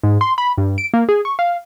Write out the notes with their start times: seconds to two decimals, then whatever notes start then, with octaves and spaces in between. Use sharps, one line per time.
0.03 G#2
0.21 C6
0.38 B5
0.58 G2
0.78 D7
0.94 A#3
1.09 G#4
1.25 C#6
1.39 F5